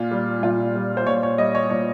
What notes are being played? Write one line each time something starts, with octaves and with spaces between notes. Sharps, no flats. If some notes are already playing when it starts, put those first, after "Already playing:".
Already playing: A#2 F4
G3
A#2 F4
G3
C5
A#2 C#5
C#5
G3 D#5
C#5
A#2 C#5